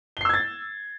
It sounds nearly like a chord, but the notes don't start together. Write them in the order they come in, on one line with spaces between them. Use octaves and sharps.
G7 C7 E6 G#6 A6